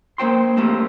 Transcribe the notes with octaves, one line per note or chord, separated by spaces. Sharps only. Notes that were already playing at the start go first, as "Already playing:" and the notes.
A#3 C5 G5 C6
G3 A3 A#3 C4